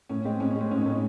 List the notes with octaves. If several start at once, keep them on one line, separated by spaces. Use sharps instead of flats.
A2 C#4
G#3 C4
A2 C#4
G#3 C#4
C4
A2 C#4
D#4
A2 C#4
D#4